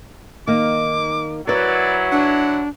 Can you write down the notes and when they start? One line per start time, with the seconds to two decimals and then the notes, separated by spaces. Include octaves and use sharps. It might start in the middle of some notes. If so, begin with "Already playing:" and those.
0.47 D#3 A#3 D#4 D6
1.47 F#3 E4 A#4 B4 D5
2.12 D4 F#5